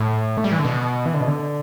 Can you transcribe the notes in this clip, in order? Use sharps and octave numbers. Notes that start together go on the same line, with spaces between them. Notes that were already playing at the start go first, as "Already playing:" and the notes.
Already playing: A2
A3
G3
E3
D3
B2
E3
D3
B2
D3